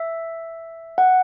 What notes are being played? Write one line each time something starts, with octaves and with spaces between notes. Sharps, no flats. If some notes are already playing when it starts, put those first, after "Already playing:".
Already playing: E5
F#5